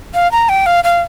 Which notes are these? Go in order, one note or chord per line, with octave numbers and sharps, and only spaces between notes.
F5
A#5
G5
F5
F5